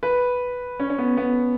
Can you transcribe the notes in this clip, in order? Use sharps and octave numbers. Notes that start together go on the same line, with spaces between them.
B4
C#4
C#4
B3
B3